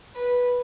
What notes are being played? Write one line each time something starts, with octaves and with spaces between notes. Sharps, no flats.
B4